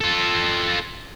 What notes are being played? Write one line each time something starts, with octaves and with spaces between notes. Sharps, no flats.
F4 A4